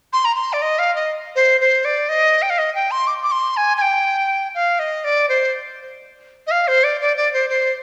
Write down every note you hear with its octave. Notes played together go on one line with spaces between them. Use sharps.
C6
A#5
C6
D5
D#5
F5
D#5
C5
C5
D5
D#5
G5
F5
D#5
G5
C6
D6
D6
C6
G#5
G#5
G5
F5
D#5
D5
C5
D#5
F5
C5
D5
D5
D5
C5
C5